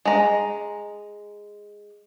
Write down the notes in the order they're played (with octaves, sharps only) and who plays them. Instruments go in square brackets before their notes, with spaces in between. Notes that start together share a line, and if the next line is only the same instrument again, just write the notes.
[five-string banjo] G#3 A#5